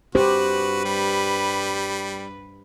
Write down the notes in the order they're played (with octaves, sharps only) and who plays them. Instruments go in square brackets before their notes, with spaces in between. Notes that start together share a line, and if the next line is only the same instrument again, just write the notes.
[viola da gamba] G2 B4 [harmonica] F#4 [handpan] G4 C5
[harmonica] G3